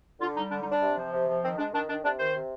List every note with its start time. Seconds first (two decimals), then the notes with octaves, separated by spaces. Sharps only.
0.20 D3 F4
0.36 G3 D#4
0.51 D3 D4
0.62 D#4
0.66 G3
0.72 D4
0.81 C3
0.97 F3
1.12 C3
1.28 F3
1.43 D#3 C4
1.58 G#3 D4
1.73 D#3 D4
1.89 D#3 D4
2.04 C3 D4
2.19 D#3 C5
2.35 C3